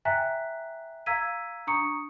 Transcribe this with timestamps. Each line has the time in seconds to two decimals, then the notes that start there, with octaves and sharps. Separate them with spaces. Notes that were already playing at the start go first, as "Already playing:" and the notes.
0.05 E5 G5 G#5 A#5 F#6 B6
1.06 F5 A#5 E6 G#6 B6 D#7
1.67 D4 A#5 C#6 D#6 C#7